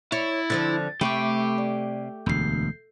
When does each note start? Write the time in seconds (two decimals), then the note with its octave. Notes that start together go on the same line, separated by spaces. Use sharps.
0.12 E4 C#5 A6
0.50 D3 F3 C4 A6
1.01 C3 A3 G4 B5 C#6 D6
1.58 D5
2.26 E1 D2 G6 C7